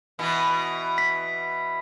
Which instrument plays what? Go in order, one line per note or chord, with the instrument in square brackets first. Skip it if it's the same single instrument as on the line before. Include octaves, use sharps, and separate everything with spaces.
[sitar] B2 E3 B3
[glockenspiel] B6